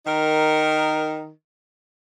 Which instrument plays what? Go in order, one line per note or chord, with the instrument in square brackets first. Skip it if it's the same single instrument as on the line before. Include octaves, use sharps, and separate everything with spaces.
[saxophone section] D#3 D#4 A#4